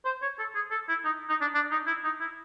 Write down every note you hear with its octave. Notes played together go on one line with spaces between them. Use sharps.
C5
C#5
A4
G#4
A4
E4
D#4
D#4
D4
D4
D#4
E4
D#4
E4